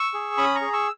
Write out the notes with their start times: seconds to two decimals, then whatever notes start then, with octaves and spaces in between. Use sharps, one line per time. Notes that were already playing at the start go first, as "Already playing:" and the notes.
Already playing: C#6 E6
0.14 G#4
0.37 C#4 B5 D#6
0.55 A#5 C#6
0.61 G#4
0.73 C#6 E6